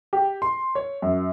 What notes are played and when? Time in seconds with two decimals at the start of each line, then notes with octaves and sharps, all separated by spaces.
0.13 G4
0.42 C6
0.75 C#5
1.02 F#2